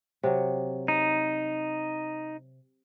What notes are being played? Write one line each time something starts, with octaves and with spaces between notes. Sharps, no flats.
C3 F#3
D#4